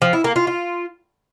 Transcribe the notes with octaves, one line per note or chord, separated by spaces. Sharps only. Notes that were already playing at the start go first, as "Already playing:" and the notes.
F3
E4
A#3
F4
F4